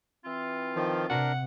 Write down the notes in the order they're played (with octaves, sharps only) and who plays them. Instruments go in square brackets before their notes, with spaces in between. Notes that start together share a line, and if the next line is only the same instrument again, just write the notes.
[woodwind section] E3 C4 F4
[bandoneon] D#3 F3
[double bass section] C3 [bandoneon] D4 A#4 [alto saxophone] F#5